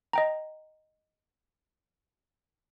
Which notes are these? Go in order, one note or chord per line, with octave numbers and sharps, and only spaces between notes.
D#5 G5 A#5